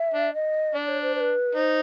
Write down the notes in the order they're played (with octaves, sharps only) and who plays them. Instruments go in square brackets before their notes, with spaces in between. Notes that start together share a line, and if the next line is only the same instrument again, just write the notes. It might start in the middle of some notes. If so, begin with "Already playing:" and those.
Already playing: [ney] E5
[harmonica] D4
[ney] D#5
[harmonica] D4 [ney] D5
[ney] C#5
C5
C5
B4
[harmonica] D#4 [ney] C5